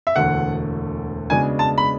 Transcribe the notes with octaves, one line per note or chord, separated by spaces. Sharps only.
E5
E1 D2 D3 A3 F#5
C#3 G#3 B3 D4 F#4 G#5
A5
B5